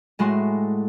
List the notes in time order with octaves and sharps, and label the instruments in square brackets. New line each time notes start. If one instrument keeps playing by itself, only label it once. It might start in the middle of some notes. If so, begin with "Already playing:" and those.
[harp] A2 G#3 A3 F#4 C6